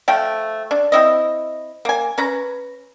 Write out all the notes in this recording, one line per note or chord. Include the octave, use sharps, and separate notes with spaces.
F3 A3 G5
D4
C4 E4 D#5
A#3 G#5
C#4 B4 A#5